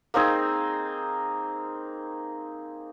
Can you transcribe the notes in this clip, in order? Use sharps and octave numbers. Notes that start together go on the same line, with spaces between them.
A#3 C4 D#4 G#4